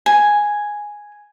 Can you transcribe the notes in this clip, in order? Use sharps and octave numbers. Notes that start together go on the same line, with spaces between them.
G#5